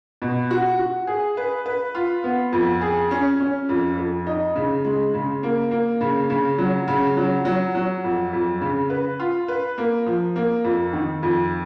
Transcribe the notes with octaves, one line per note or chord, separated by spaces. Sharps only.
B2
F#4
F#4
G#4
B4
B4
F4
B3
F2
G#4
C#4
C#4
F2
F2
D#4
C#3
G#3
C#3
A#3
A#3
C#3
C#3
F#3
C#3
F#3
F#3
F#3
F2
F2
C#3
B4
F4
B4
A#3
F3
A#3
F2
D#3
F2